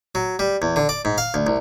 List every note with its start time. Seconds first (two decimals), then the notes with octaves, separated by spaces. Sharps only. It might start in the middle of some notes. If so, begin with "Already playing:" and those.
0.15 F#3
0.39 G3
0.62 E2
0.76 D3
0.89 D5
1.05 G#2
1.18 F5
1.34 D2
1.47 C2